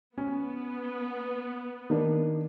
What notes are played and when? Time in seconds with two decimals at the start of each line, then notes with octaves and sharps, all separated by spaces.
0.18 B3 C#4
1.90 D#3 A#3 D4